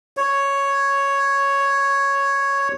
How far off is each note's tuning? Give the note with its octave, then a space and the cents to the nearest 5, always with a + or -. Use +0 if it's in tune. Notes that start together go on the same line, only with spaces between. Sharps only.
C#5 +0